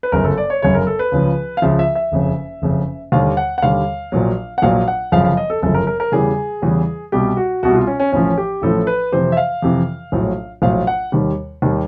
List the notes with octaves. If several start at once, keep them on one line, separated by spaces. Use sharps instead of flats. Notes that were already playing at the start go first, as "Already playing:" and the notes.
B4
G1 F#2 C#3 A#4
A4
D5
C#5
G1 F#2 C#3 C#5
A#4
A4
B4
C#2 C#3 F3
F5
C#2 C#3 F3 E5
E5
E5
F#1 F2 C#3
F#1 F2 C#3
D#2 D3 G3 F5
F#5
F#5
D#2 D3 G3 F5
A#1 A#2 F#3
F#5
A#1 A#2 F#3 F5
F#5
G1 F#2 C#3 F3 F5
F5
D#5
A4
G1 F#2 C#3 F3 A4
A#4
A#4
A#4
E2 C#3 E3 G3 G#4
E2 C#3 E3 G3
C2 B2 G3 G4
F#4
C2 B2 G3 F#4
F4
C#4
C#4
A1 A2 F3 C#4
G4
A1 A2 F3 A4
B4
F2 C3 E3 C5
E5
F5
F2 C3 E3
A#1 A2 F#3
A#1 A2 F#3 F5
F#5
D#2 D#3 G3
D#2 D#3 G3